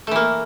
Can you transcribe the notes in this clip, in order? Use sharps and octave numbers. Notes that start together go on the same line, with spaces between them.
E3 A3 A#3